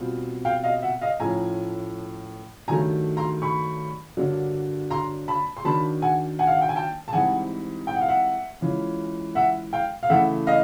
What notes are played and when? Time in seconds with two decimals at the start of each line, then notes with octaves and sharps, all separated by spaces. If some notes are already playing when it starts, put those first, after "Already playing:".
Already playing: B2 G3 C4 F4
0.45 F5 G5
0.63 D#5 F5
0.82 E5 F#5
1.01 D#5 F5
1.19 A2 F3 A3 C#4 F4 G#5 A#5
2.68 G2 D#3 F#3 A3 G#5 A#5
3.17 A#5 C6
3.42 B5 C#6
4.17 G2 D3 F#3 A#3 D4
4.91 A#5 C6
5.28 A5 B5
5.57 C6
5.64 D#3 F#3 A#3 D4 A5 B5
6.02 F#5 G#5
6.39 F#5 G#5
6.47 F5
6.55 F#5
6.61 G5
6.69 G#5
6.76 G5 A5
7.08 A5
7.13 G#2 E3 G3 C4 F#5 G#5
7.87 G5
7.95 F#5
8.01 F5
8.09 E5 F#5
8.61 E3 G#3 C#4 F4
9.35 E5 F#5
9.73 F5 G5
10.03 F5
10.10 C#3 E3 A3 E5 F#5
10.47 D#5 F5